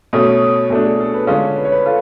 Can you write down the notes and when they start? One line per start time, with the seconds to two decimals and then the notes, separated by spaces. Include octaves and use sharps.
0.13 B2 A3 C#4 C#5
0.70 B2 A3 D4
0.86 G#4
1.00 A4
1.14 B4
1.27 D3 G#3 C#4 F4 C#5
1.57 B4
1.65 C#5
1.72 B4
1.86 F4 A4